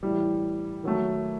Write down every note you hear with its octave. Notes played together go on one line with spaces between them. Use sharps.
A2 E3 G3
D#3 F#3 A3